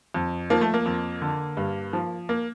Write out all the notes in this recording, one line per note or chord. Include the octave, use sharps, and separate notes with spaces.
F2
F3 A#3
A3
A#3
F2
D3
G2
F3
A#3